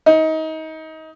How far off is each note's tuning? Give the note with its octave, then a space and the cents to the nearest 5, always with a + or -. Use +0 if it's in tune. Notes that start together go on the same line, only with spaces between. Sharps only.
D#4 +25